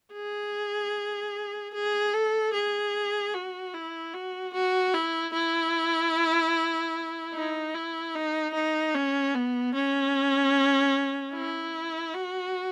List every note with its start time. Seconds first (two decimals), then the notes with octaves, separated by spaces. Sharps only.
0.13 G#4
1.74 G#4
2.13 A4
2.53 G#4
3.33 F#4
3.74 E4
4.14 F#4
4.53 F#4
4.93 E4
5.33 E4
7.34 D#4
7.74 E4
8.15 D#4
8.54 D#4
8.94 C#4
9.35 B3
9.75 C#4
11.34 E4
12.14 F#4